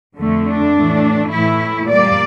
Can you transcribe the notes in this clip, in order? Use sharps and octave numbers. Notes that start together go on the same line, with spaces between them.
F2 D3 A3
D4
A2 E3 A3
A2 E3 A3 E4
A#2 G3 A#3 D5